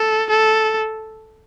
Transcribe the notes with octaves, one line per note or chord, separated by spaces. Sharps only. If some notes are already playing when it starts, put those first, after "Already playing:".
Already playing: A4
A4